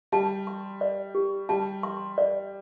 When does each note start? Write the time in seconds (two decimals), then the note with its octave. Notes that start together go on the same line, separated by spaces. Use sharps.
0.12 G3 A5
0.47 C6
0.81 D5
1.15 G4
1.49 G3 A5
1.83 C6
2.18 D5